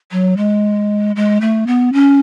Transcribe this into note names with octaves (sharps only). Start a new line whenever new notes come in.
F#3
G#3
G#3
A3
B3
C#4